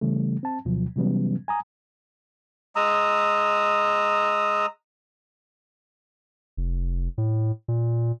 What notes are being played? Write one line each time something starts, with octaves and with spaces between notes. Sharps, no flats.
C#3 E3 G3 A3
C4 A5
D2 B2 F3 F#3
C3 E3 F#3 G3 B3 C#4
G#5 A#5 D#6
G#3 A#5 D#6 E6
F1
A2
A#2